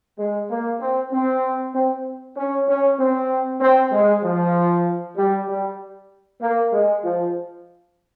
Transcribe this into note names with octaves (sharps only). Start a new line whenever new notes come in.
G#3
A#3
C4
C4
C4
C#4
C#4
C4
C4
G#3
F3
G3
G3
A#3
G#3
F3